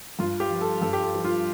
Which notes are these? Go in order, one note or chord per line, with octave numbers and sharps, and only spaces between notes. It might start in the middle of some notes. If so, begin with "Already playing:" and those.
G2 F4
G4
F3
A4
G2 A4
G4
A4
F3
F4